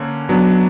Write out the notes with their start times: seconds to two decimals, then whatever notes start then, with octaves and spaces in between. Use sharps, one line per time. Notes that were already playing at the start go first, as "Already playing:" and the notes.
Already playing: D3 A#3 C#4
0.29 F#3 B3 D4